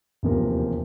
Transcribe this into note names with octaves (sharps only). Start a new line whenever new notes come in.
E1 D#2 C3 F3 A#4